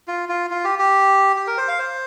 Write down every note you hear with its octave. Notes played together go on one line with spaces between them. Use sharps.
F4
F4
F4
G4
G4
G4
A#4
C5
F5
C5